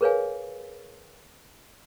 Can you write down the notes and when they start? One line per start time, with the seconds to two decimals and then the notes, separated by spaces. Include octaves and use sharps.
0.01 G#4 A#4 B4 C#5 F5 G#5